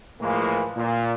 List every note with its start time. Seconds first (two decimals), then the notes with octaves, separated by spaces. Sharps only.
0.21 A2 E3 F3 G#3 A#3
0.76 A#2